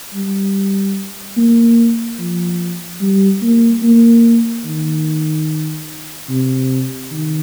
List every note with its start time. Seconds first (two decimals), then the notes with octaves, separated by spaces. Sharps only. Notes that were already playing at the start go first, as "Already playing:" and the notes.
0.14 G3
1.37 A#3
2.20 F3
3.01 G3
3.42 A#3
3.83 A#3
4.65 D#3
6.29 C3
7.11 D#3